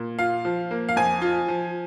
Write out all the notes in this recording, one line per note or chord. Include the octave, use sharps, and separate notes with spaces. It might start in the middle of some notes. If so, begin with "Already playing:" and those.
Already playing: A#2
F4 F5
F3
A#3
F5
F2 G#5
F4
F3